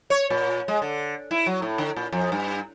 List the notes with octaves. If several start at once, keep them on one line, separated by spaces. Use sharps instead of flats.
C#5
A#2
G#3
D3
E4
F#3
A2
D3
A#2
F2
G2